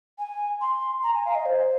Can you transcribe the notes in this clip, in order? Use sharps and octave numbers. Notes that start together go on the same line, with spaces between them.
G#5
C6
A#5
G#5
F5
D#5
C5